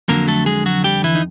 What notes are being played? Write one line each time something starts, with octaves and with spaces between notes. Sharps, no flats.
F2 D3 F#3 A#3 A#4
A3 A4
G#3 G#4
F#3 F#4
G3 G4
E3 E4
D#4